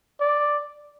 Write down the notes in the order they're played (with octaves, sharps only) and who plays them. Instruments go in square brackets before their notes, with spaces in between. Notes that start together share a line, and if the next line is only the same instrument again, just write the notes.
[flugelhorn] D5